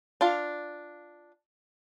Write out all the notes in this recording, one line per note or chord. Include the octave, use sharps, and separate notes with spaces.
D4 F4 F5